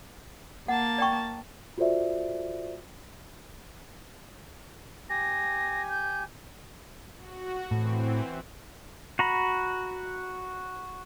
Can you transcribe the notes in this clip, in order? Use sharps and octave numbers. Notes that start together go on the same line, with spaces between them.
A#3 F#5 A5
D5 G5 C#6
F4 F#4 A4 C5 D5 E5
G4 G#5 A#6
G6
F#4
A2 E3 C4
F#4 A#5 B5